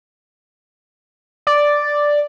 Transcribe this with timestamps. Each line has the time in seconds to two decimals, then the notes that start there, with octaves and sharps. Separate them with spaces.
1.47 D5